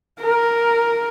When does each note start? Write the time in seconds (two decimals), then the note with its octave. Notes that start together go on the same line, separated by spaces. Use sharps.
0.20 A#4